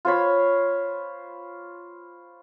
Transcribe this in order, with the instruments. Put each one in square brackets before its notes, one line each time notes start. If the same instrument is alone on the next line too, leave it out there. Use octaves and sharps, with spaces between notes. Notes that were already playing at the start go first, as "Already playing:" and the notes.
[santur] F4 C5 C#5 B5